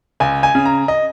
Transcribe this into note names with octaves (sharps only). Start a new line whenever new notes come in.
C#2 G#5
G#5
C#3
A#5
D#5